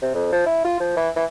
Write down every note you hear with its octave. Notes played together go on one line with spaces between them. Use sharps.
C3
F2
F3
E4
F4
F3
E3
E3